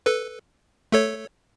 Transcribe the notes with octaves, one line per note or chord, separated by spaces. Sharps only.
A4 B4
A3 A4 C#5